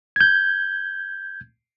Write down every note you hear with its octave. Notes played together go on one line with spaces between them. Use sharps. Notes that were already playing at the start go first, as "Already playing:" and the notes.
G6 G#6